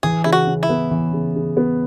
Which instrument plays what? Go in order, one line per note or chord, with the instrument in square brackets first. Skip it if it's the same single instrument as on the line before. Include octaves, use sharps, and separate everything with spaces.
[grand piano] E3 [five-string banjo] G#4
[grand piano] C#3 [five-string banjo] E4
[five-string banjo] F#4
[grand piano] C#3
[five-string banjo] E4
[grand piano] B3
E3
C#3
C#3
B3